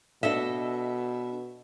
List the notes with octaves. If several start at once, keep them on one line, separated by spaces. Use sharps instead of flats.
B2 D4 A4 D#5 E5